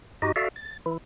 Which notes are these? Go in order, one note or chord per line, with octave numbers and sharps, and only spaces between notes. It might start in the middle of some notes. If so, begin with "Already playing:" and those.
G2 D#4 F#4 G4 D#5
F#4 A4 D5 E5 F5
A6
E3 E4